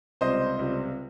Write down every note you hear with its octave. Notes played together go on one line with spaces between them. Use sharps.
C#2 C3 G3 C5 D#5
C#2 C3 G3